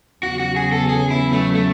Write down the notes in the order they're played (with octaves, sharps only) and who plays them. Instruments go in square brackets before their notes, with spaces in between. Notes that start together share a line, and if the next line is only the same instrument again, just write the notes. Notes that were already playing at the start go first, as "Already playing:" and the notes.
[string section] E2 C#3 F#3 B3 [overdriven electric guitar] F#4
[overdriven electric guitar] F#4
G#4
A4
G#4
E4
A3
A3